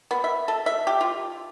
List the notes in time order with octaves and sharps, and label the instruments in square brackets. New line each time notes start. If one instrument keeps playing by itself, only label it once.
[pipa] B3
E5
A4
E5
G4
F4